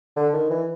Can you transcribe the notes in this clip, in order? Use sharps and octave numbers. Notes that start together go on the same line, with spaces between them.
D3
D#3
E3